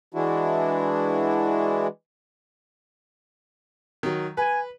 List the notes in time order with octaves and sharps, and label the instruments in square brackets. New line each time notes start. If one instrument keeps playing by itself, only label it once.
[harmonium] E3 G#3 D4 E4 F#4
[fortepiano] D#3 F#3
[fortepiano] B4 [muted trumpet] G#5